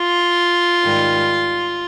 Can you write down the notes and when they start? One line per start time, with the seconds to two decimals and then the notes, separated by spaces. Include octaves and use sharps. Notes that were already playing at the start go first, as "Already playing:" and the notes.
Already playing: F4
0.82 G#2 D#3 G3